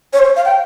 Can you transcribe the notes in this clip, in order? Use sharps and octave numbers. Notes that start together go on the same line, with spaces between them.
C#5
C5
F5
G5